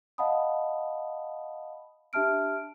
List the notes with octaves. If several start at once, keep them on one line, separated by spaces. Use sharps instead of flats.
D#5 F5 F#5 A5 B5 D#6
D4 G4 E5 A5 F6 D7